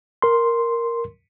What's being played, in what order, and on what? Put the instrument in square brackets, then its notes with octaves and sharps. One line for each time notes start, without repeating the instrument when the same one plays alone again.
[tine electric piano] A#4 C6